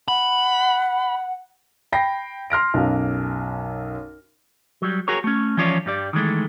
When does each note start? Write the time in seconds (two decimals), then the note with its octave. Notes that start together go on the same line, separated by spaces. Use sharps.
0.08 F#5 B5
1.92 G5 B5 A#6 C7
2.50 C6 F6 A#6 D7
2.74 B1 F#2 F5
4.82 F#3 G3
5.08 F#4 G#4 A#4 C#5
5.24 A3 C#4
5.57 E3 F3 C#4 F4 C#5 D5
5.86 G2 G3 D5
6.13 D#3 E3 G#3 A3